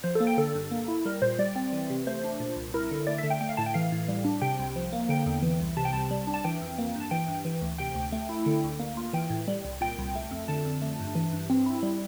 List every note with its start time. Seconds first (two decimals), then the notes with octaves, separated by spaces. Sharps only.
0.04 F3 C5
0.15 A4
0.20 A#3
0.27 G5
0.38 D3 A4
0.55 G2
0.71 A#3
0.88 E4
1.05 G3 A#4
1.22 A#2 C5
1.39 G3 D5
1.56 C4
1.73 E3
1.90 C3
2.07 A3 C5
2.24 D4
2.40 A#2
2.56 C2
2.74 E4 A#4
2.91 D3
3.07 A3 D5
3.18 E5
3.24 D3
3.30 G5
3.41 A3 G5
3.49 F5
3.57 A2 A5
3.66 G5
3.74 E3 F5
3.92 A2
4.08 G3
4.25 D4
4.41 C3 G5
4.59 C2
4.76 F3
4.92 A#3
5.09 D3 G5
5.26 E2
5.43 E3
5.61 C2
5.77 C3 A5
5.85 G5
5.93 C2 A5
6.11 G3
6.27 D4
6.34 A5
6.44 E3 G5
6.62 F2
6.79 A#3
6.95 G2
7.00 A5
7.11 E3 G5
7.28 G2
7.45 E3
7.62 D2
7.78 C3 G5
7.95 D2
8.12 A3
8.29 E4
8.46 D3
8.64 D2
8.79 A#3
8.97 F4
9.13 E3 G5
9.30 A2
9.48 G3
9.65 C2
9.81 A#2 G5
9.98 C2
10.15 A3
10.31 F2
10.48 D3 A5
10.65 F2
10.82 A3
11.00 G2
11.15 E3
11.33 G2
11.50 C4
11.66 E4
11.83 G3